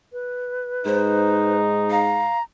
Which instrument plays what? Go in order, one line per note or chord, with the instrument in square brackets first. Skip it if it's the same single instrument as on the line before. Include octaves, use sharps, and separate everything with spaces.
[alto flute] B4
[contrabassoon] G#2 [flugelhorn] D#4 [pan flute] C5
[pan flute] F5 [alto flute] A#5